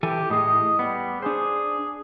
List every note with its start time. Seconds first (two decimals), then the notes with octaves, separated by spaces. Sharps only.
0.03 E3 G4 A4 G#5
0.30 A2 G#4 D#5
0.79 G3 B3
1.22 D4 G#4 C5